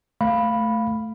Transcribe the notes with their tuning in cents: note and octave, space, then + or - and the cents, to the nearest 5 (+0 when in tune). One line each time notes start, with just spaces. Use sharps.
A3 +0 F5 +0 B5 +0